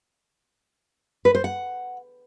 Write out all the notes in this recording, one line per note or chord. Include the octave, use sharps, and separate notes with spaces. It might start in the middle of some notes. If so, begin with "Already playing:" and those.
B4
C5
F#5